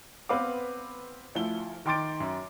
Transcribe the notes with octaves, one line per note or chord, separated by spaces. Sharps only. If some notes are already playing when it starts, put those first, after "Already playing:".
B3 C4 B4 F5 D6
D2 F3 E4 G7
D#3 G5 C6 D6 A6 D7
F#2